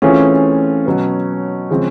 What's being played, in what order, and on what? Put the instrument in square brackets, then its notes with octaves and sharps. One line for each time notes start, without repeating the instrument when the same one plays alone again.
[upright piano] E3 A3 C4 F4 G#4 [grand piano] C#4
[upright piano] B2 F#3 B3
C#3 F3 G#3 C4